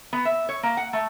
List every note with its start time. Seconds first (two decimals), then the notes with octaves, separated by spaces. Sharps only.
0.13 B3
0.25 E5
0.49 C#5
0.63 A#3
0.77 F#5
0.93 A3